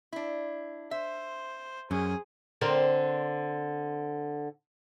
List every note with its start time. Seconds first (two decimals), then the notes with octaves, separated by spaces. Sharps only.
0.13 D4 E4
0.91 C5 E5
1.91 F#2 C#4 G#4
2.61 D3 C4 A#4